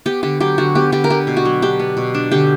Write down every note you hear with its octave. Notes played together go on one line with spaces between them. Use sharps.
B3 G4
D3 G4
F#3 G4
D3 F#4
B3 G4
D3 G4
A#4
B3 G4
B2
F#4
F#3
D4 G4
B3
B2
D4
D3 G4